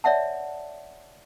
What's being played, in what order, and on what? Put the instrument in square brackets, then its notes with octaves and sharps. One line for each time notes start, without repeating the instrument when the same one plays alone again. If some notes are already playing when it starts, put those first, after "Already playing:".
[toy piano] C#5 D5 E5 F#5 A5